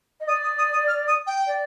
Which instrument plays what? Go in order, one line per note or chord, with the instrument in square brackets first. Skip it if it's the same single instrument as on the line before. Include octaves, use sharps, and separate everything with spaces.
[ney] D#5
[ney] D5 [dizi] D#6
[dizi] D#6
D#6
D#6
F6
D#6
G5
[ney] D5